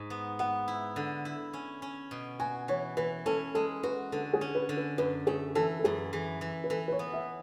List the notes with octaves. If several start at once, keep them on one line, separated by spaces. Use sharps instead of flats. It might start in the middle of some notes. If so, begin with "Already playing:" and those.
Already playing: G#2
B3
B3 F#5
E4
D3
E4
C#4
C#4
B2
F#4 G#5
E3 C#5
E3 B4
C#4 A4
G#3 A4
F#4 B4
D3 A4
G#4
C#4
B4
D3
B4
F#2 B4
A3 G#4
E3 A4
A4
F#2 G#4
E3
E3
B4
E3 A4
B4
C#5
B3
E5